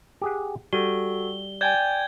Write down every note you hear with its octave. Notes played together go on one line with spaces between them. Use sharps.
G4 G#4 F#5
G3 F#4 A4 G7
D5 G5 G#5 G6 G#6 G7